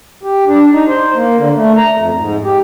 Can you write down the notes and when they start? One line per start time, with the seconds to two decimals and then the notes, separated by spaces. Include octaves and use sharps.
0.23 G4
0.47 D4
0.73 D#4
0.88 C5
1.15 A#3
1.38 D3
1.56 A3
1.77 A#5
1.96 F2
2.17 G#2
2.45 G4